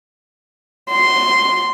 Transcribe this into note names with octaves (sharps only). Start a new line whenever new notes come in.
C6